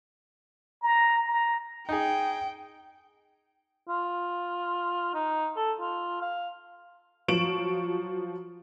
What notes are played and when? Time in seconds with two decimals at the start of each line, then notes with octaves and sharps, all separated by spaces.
0.83 A#5
1.27 A#5
1.89 D#4 G#4 G5
3.88 F4
5.14 D#4
5.56 A4
5.80 F4
6.22 F5
7.28 F3 F#3 C#6 D7 E7 F#7